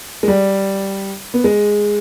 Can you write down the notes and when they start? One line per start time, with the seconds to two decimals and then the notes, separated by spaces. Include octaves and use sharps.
0.23 G#3
0.28 G3
1.34 B3
1.44 G#3